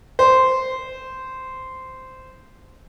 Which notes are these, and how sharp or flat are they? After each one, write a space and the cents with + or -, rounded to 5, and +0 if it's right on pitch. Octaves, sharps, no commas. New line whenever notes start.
C5 -10